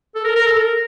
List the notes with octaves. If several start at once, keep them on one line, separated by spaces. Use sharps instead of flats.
A4
A#4
A#4
A4
A#4